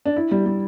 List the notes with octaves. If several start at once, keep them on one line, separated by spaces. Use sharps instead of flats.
D4
E4
G3
G3